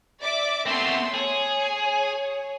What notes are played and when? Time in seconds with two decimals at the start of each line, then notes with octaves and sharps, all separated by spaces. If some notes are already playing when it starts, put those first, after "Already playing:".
0.20 D5 E5 D6
0.66 A3 B3 C4 C6 E6
1.14 G#4 C#5